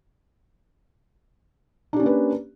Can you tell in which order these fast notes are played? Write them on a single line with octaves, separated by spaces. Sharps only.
D4 G4 C#4 A#3 B4